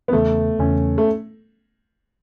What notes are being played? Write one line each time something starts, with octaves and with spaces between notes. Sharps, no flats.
B3
E2 C#3 E3 A3
E2 C#3 E3 C#4
A3